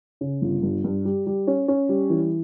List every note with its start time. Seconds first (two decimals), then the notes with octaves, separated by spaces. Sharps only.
0.21 C#3
0.42 G1
0.63 G2
0.84 G2
1.05 G3
1.26 G3
1.47 C#4
1.68 C#4
1.89 G3
2.10 E3